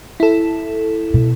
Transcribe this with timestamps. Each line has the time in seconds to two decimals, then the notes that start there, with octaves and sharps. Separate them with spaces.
0.20 E4 A4
1.14 B2